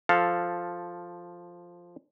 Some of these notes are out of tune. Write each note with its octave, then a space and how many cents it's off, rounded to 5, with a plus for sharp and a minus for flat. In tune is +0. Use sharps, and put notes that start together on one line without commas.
F3 +0 A4 +0 F5 +0